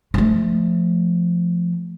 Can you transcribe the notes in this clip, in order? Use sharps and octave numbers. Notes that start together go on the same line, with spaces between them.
F3 A3